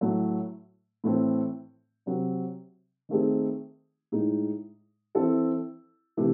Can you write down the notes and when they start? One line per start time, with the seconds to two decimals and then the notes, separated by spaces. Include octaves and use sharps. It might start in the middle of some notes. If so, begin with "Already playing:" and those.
0.01 A2 F#3 A3
1.04 A2 E3 A3 C4
2.06 C3 F#3 C4
3.09 D#3 A3 C4 D#4 G#4
4.12 A2 G#3 D#4
5.15 E3 C4 E4 A4
6.17 C3 E3 A3